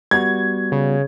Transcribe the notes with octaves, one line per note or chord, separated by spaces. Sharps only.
G3 B3 F#4 G#6
C#3